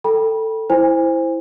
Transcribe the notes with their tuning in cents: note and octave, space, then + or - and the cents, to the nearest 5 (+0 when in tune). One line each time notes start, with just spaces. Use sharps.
A4 +15 G5 +0 B5 -30
E4 +0 C5 +0 G#5 -30